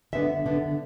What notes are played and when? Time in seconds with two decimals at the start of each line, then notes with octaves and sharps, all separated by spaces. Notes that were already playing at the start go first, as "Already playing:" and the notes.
0.13 D3 B3 D4 E5
0.46 D3 B3 D4